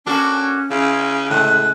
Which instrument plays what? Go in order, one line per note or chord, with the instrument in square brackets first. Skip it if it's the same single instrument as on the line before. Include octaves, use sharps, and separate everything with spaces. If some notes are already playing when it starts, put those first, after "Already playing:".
[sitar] A#3 F#4 A4 [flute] C#4 [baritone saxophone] D4
[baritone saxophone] C#3 [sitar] E4
[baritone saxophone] A2 [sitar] C#3 G#3 [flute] F#6